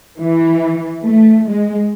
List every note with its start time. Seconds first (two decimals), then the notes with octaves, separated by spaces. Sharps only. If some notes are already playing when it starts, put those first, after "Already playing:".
0.20 E3
1.03 A3
1.51 G#3